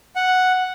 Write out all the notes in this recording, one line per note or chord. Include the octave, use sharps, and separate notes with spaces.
F#5